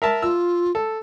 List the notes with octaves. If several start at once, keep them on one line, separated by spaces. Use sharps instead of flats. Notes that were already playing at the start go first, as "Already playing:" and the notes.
A#4 E5 A5
F4 E6
A4